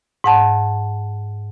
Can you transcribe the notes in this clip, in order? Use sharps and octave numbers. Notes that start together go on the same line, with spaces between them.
G#2 F#5 A5